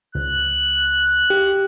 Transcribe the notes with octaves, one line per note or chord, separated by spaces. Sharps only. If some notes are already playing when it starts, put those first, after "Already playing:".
C#2 F#6
G4